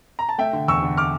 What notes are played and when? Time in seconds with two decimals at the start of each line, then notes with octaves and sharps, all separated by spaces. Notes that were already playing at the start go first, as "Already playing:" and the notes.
0.19 A#5
0.29 A5
0.38 A3 E5 G5
0.53 D3
0.68 E2 C#6 E6
0.82 D3
0.97 D6 F6